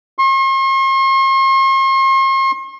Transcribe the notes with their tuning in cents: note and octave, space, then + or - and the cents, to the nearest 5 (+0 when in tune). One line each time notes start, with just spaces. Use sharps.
C6 +45